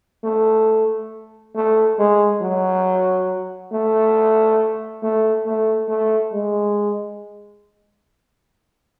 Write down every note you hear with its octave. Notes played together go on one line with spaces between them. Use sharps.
A3
A3
G#3
F#3
A3
A3
A3
A3
G#3